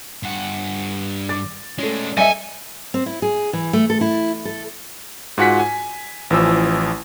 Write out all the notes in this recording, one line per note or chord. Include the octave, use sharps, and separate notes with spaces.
G2 F#5
D6 A6
G#3 A3 C#4 D4
G2 A4 D#5 E5 G#5 C#7
C4
E4
G#4
E3
A3
A4
E4
A4
G#2 F4 F#4 F#5 G#5 B6
G#5
A1 E3 F3 E6